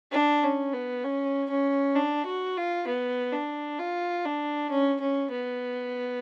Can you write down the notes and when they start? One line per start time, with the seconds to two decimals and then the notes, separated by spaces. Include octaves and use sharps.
0.12 D4
0.44 C#4
0.73 B3
1.04 C#4
1.50 C#4
1.95 D4
2.26 F#4
2.57 F4
2.87 B3
3.32 D4
3.79 F4
4.25 D4
4.70 C#4
5.00 C#4
5.31 B3